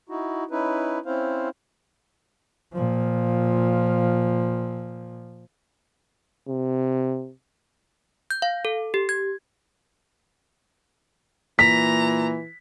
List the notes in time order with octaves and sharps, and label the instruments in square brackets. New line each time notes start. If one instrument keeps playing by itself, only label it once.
[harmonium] D#4 E4 F#4
C#4 D#4 E4 B4
C4 C#4 E4 C5 F5
[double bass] A#2 F3
[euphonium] C3
[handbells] G6
F5
A4
G4
G#6
[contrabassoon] A#2 [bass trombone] E3 [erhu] A#5 [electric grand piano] B6